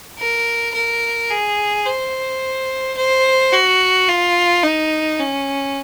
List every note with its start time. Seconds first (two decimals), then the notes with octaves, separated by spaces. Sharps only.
0.19 A#4
0.74 A#4
1.30 G#4
1.86 C5
2.97 C5
3.53 F#4
4.08 F4
4.64 D#4
5.20 C#4